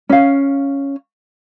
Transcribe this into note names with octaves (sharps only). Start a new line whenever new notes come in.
C#4 F5